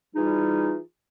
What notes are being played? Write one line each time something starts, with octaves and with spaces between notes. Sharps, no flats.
E3 G3 D#4 F4 G#4